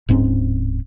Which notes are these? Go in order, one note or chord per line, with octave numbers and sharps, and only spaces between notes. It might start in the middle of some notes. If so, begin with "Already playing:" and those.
D1 G#2 C4 C#4